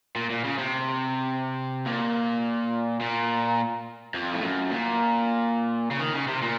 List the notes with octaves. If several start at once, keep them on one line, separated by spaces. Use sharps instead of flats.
A#2
A#2
C#3
C3
A#2
A#2
F2
A2
F#2
A#2
C#3
D#3
C#3
C3
A#2